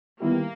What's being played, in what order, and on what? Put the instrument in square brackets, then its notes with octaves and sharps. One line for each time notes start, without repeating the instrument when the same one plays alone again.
[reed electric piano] D#3 G3 B3 E4 G4 [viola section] A#3